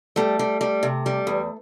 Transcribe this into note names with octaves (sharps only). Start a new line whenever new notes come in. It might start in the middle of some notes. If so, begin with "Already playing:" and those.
G3 A3
G3
G3
C3
G3
E2